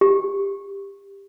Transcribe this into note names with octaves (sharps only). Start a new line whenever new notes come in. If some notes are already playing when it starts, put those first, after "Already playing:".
G4